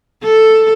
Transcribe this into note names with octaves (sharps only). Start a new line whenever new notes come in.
A4